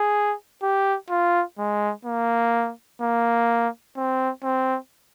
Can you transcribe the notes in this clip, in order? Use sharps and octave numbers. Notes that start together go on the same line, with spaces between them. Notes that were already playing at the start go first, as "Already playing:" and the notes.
Already playing: G#4
G4
F4
G#3
A#3
A#3
C4
C4